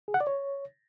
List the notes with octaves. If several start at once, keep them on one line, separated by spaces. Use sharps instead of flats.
G#4
F#5
D5
C#5